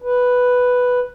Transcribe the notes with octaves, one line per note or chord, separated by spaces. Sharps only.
B4